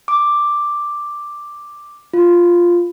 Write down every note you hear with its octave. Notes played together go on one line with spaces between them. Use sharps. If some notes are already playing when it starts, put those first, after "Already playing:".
D6
F4